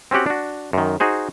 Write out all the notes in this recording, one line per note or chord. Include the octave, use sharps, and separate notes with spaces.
C4 C#4 F#4 G4 F#5
D4 F#4
F#2 D#3
D#4 F#4 G#4 C5